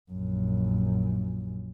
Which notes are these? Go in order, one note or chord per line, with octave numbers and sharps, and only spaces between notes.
A#1 F#2